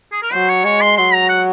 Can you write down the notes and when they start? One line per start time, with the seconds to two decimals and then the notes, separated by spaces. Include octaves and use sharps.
0.12 G#4
0.22 A#4
0.33 F#3 C5
0.49 C#5
0.64 G#3 C#5
0.81 C6
0.97 F#3 C6
1.13 A#5
1.29 F#5